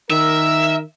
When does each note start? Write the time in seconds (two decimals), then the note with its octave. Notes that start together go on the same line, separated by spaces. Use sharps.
0.10 D#3 A#4 E5 E6